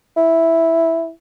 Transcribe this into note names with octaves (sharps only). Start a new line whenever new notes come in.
E4